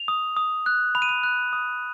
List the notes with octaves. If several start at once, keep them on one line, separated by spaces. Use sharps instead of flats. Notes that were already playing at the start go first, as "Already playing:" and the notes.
Already playing: F7
D#6
D#6
F#6
B5 F7
D#7
F7
F#6
D#6